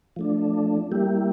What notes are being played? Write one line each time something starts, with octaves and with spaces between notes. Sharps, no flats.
F3 A3 D4
G3 A#3 E4 G4